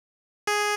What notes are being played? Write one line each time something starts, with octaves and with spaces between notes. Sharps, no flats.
G#4